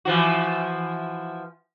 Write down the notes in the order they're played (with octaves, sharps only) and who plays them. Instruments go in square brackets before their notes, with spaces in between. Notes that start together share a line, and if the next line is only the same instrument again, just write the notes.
[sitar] E3 F3 F#4